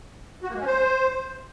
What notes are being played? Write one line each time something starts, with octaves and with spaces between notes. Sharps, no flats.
F#4
A#3
G#3
C#4
C5